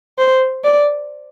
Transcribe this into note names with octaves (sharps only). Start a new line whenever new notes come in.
C5
D5